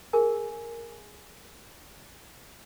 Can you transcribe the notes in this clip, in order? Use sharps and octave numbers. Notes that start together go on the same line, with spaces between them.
G#4 A#4 G#5